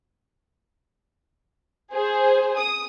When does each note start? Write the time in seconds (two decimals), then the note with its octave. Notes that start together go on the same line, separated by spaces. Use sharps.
1.93 G#4 C5
2.57 D#6